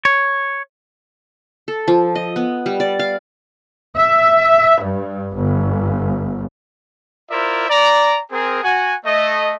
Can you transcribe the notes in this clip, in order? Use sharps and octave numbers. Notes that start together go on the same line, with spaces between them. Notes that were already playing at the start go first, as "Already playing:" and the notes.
C#5
A4
F3
D#5
B3
G3
D5
F5
E5
G2
G1
E4 F4 A#4 C5 D5 E5
D5 A#5
C4 G#4 A#4
F#4 F#5 G#5
A3 D#5